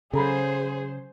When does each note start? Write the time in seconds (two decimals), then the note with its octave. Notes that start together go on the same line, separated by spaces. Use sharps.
0.13 C#3 F#3 G#4 A4 C5 A#5 B5